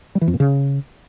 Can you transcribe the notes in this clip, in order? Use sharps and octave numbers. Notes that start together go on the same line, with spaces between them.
G3
E3
F2
A#2
C#3